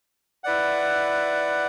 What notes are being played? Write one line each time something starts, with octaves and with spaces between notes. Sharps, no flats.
E4 B4 D5 F#5